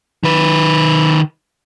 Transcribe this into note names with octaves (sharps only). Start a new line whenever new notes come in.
D#3 B4